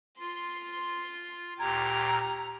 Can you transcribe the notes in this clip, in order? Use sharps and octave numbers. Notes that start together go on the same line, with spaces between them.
F4 C6
D2 A#2 G4 A#5 G#6